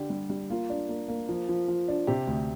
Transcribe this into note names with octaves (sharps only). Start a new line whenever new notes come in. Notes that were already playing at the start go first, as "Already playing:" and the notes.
Already playing: D3 D4 G4
G3
G3
A#3 F4
D4
A#3
A#3
F3
F3
F3
D4
C3 G4
D2